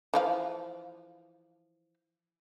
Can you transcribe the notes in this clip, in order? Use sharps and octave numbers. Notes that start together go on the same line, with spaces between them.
E3 F3 F5